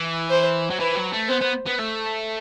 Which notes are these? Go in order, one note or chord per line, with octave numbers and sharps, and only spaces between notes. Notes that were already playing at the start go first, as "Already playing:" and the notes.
Already playing: E3
C5
F#3
E3 B4
F#3
A3
B3 C5
B3
B3
A3